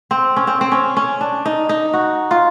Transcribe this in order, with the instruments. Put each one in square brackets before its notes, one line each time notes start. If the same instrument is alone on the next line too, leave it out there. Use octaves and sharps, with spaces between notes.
[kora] C4
C#4
C4
C4
C#4
C#4
D4
D#4
D#4
F#4
F4